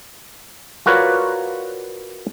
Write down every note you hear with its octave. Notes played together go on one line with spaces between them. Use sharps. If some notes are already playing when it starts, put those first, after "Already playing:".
F4 F#4 A#4 B4 C#5 D5